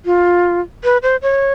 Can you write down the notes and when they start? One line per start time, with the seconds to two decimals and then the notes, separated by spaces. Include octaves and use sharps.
0.05 F4
0.84 B4
1.03 C5
1.22 C#5